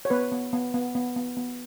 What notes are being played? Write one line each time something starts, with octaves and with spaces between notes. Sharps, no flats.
C#5
B3 B4
B3
B3
B3
B3
B3
B3